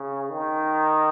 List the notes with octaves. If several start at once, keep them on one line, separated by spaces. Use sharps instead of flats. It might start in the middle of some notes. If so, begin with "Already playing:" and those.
Already playing: C#3
D#3